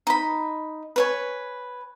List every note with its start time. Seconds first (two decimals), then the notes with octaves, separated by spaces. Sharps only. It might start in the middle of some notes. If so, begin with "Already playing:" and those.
0.07 D#4 B5
0.96 B4 C#5 G#5